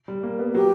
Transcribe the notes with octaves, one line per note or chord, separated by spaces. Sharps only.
G3
A#3
B3
F#3 G4